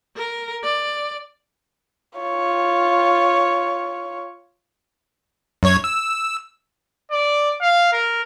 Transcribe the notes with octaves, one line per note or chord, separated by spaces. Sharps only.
A#4
D5
F4 C#5
F#2 C#5 G#6
E6
D5
F5
A#4